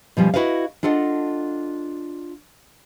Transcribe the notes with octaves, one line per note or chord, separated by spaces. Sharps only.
B2 F3 G3 C#4
E4 F#4 B4 D#5 F5
D4 F4 A4 D#5 F#5